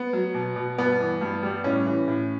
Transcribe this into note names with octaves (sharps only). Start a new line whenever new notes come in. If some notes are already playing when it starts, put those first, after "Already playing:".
Already playing: B3
F#3
B2
B2
G2 B3
E3
G2
G3
A2 C#4
E3
A2